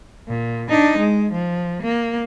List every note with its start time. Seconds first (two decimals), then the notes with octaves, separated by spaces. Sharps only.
0.29 A#2
0.70 D4 D#4
0.99 G#3
1.33 F3
1.83 A#3